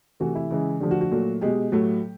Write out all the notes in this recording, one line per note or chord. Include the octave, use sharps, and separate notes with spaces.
C3 E3 A3 F#4
E4
C#3 E3 G#3
D3 F3 A3 G4
F#4
F#4
A#2 F#3 A3
B2 G#3 G4
A2 F#3 A3